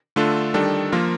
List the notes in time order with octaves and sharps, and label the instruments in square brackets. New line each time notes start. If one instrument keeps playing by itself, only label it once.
[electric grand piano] D3 A3 D4 F4 A4
D#3 G3 D4 A4
F3 A#3 F4 A#4